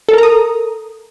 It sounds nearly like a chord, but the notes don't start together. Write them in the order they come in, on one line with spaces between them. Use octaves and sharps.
A4 A#4 A#5 D#6